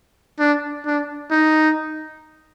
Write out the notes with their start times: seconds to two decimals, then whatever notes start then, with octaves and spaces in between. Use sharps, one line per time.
0.39 D4
0.86 D4
1.31 D#4